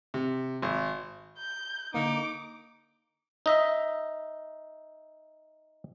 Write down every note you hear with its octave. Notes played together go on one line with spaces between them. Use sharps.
C3
G#1
G6
D3 A#3 D#4 D6
D#4 D#5 E5